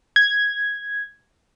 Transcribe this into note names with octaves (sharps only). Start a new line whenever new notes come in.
G#6